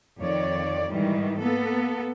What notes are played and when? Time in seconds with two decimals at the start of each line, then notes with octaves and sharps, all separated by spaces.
0.20 F2 D#3 C#5 D5
0.92 G#2 D#3 E3 G3
1.39 A#3 B3 A4